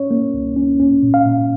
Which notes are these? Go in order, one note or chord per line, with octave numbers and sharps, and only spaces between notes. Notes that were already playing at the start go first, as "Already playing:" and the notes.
Already playing: C#4 C#5
A#3
C#2
C#4
C#4
A#2
F5
A#2